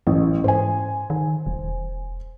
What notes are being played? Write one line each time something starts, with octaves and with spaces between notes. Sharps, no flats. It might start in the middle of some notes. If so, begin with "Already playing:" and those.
A1 E3
G#2 C5 G#5
D#3
E1